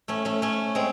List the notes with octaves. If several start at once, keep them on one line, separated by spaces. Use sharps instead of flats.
A3 C#4
A3 C#4
A3 C#4
G#3 C4